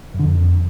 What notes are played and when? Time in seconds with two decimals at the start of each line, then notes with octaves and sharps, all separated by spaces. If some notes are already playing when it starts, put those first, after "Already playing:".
0.14 F#2
0.20 D3
0.25 F2